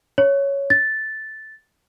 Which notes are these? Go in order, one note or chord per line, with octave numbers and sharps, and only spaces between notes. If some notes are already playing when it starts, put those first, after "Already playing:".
C#5
A6